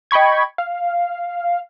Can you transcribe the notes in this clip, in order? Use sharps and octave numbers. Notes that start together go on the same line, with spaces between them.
D#5 G5 B5 C#6 G#6
F5